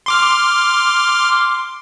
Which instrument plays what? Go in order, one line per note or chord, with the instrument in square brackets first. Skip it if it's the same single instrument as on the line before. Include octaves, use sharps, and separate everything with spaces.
[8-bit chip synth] C6 D6 F6